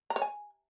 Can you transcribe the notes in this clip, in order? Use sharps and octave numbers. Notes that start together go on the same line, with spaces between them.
A#5
C#5
G#5